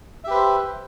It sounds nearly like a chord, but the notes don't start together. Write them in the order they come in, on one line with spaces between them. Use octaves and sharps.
E5 G4 B4 C5